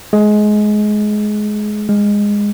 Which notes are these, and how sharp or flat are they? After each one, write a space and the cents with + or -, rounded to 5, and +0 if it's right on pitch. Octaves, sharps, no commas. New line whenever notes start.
G#3 +20
G#3 -15